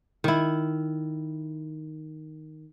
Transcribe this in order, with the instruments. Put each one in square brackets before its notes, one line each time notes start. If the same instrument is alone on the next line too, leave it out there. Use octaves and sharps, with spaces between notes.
[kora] D#3 E4